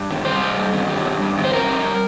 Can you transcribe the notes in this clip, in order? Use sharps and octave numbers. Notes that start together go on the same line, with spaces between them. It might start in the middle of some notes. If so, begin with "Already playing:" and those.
Already playing: G2
D#3
G3 C5
G2
G2
D#3
G3
G2
G2
D#3
C5
G3 A#4
G2